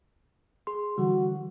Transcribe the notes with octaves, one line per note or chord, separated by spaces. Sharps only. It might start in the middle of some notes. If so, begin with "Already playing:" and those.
G#4 C6
D3 E3 G3 F#4